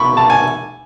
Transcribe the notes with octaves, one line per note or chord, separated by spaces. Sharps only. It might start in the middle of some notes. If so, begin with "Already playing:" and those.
Already playing: B2 B5 C#6 D6
A5
G#5